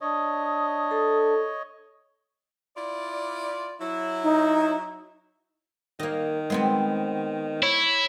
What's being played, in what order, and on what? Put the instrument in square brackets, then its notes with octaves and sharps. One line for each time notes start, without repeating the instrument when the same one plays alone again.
[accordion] D4 [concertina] C#5 D#5 [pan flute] D#6
[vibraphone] A4
[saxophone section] E4 F4 D5
F#3 E4
[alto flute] D#4
[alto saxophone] D#3 [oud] A#3 D#5
[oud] G#3 B3 C4
[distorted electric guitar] E4 [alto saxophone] C#5